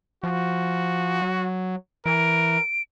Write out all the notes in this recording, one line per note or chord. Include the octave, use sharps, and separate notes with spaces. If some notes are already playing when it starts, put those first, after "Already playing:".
F3 F#4
F#3
E3 A#4 D7